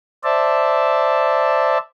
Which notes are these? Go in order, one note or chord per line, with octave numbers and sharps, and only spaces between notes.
C5 D5 E5 A5